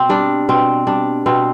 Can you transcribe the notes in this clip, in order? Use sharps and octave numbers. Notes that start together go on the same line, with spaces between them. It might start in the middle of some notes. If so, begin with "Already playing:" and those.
Already playing: B2 C4
G3 D4
B2 C4
G3 D4
B2 C4